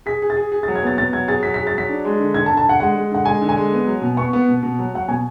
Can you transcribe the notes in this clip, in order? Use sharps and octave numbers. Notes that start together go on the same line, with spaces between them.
G#4 B6
G#4
A6
G#4
G#4
F#3 A6
G#6
B3 A6
B3 A6
F#3 G#6
G#4 A6
F#3 B6
B6
G#4
A6
F#3 B6
D4
G#3
D3
D3 G#6
A5
D3
A5
D3 F#5
G#3 F#5
G#3
D3 F#5
G#3 G#5
D3
G#5
G#3
B3
F#3
B2
B3 C#6
B3
B2
B2
F#3
F#3 F#5
B2 G#5